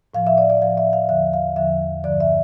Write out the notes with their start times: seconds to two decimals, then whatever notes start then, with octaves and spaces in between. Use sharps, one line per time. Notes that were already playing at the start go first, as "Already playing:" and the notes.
0.14 A2 F3 F5
0.27 E5
0.38 D5
0.50 D5
0.62 A2 F3 F5
0.77 E5
0.93 F5
1.09 E2 D3 F3 E5
1.33 F5
1.56 E2 D3 F3 E5
2.04 G2 D3 F3 D5
2.20 E5